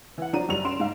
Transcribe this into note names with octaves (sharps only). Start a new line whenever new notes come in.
E3 F#5
F3 F#3 D4 F#4 A#5 D#7
F#1 G3 F7
C#3 C6 D7 E7
G#2 F5